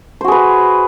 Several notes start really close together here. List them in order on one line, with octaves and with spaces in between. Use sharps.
C5 F#4 G#4 B4